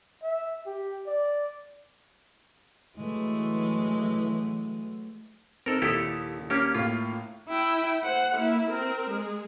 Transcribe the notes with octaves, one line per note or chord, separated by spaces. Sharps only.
E5
G4
D5
E3 F#3 G#3 A3
C4 D#4 A4 A#4
D#2 A#2 E4 G4 A4 D#6
A#3 C#4 G4
A2 A#3 F4 F5
E4 G5
C5 F#5
A#3 E4
C4 A#4
G#3